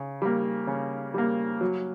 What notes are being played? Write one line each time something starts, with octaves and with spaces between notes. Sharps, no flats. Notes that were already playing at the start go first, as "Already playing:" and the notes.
Already playing: C#3
G3 A#3
C#3
G3 A#3
F#3